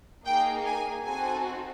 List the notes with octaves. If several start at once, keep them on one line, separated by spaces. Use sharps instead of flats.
A#3 D#4 G#4 G5
G#5
C4 D#4 F#4 A4 G#5